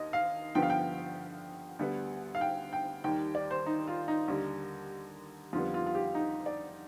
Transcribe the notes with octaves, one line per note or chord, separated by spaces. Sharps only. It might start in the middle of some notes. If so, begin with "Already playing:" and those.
Already playing: D#2 D#3 D#5
F5
G2 D3 F3 B3 G5
F5
G5
D2 D3 G3 B3
F5
G5
G5
D#2 D#3 G3 G5
D5
C5
D#4
F4
D#4
D#2 D3 G3
F2 D3 G3 B3 F4
F4
F4
G4
D#4
D5